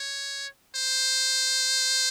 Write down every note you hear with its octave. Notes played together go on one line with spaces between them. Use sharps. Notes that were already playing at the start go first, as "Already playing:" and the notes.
Already playing: C#5
C5